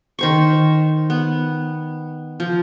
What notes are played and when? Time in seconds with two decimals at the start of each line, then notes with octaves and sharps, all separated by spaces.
0.19 D#3 C5 C#6
1.10 B3
2.40 F3